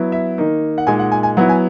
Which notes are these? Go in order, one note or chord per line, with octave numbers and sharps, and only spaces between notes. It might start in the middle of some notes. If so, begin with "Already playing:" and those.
Already playing: F#3 B3 E4
E5
D#3 A#3 D#4
F#5
A#2 G#3 D#4 G#5
F#5
G#5
G#5
F#3 B3 E4 F#5
G#5